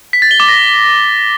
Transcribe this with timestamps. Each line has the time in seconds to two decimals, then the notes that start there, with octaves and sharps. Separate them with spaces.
0.13 B6
0.22 A6
0.31 G7
0.40 D6
0.49 A#6